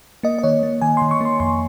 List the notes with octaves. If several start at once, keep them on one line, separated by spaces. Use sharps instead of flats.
A#3 D#5
D#5
D#3 C#5
A#3
D#3 G#5
D#3 C6
C#6
A#3 C6
F2 C6